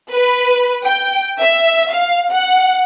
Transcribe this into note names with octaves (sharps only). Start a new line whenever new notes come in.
B4
G5
E5
F5
F#5